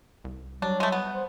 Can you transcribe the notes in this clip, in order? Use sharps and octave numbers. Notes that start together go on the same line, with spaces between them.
C2
F#3 G3 D4
G#3 A3
B3
C5